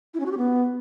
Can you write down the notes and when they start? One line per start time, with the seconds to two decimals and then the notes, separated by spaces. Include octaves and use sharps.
0.14 E4
0.20 C#4
0.26 F#4
0.32 G4
0.38 B3